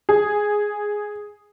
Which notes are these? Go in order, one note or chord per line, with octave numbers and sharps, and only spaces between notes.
G#4